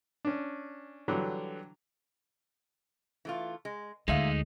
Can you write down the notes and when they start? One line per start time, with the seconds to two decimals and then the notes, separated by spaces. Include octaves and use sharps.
0.25 C#4 D4
1.08 D3 E3 F#3 G3
3.25 E3 A3 F4
3.65 G#3
4.08 D2 A#2 G#3 D#4 E5 F5